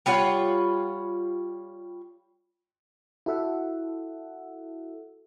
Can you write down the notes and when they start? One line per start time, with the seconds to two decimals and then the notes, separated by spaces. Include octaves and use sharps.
0.06 G3 F4 C#5 F#5
3.26 E4 F#4 A4 E5 F#5